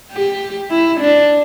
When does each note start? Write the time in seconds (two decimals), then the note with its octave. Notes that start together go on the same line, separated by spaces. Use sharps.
0.13 G4
0.71 E4
1.00 D4